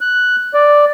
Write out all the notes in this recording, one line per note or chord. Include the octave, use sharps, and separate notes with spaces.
F#6
D5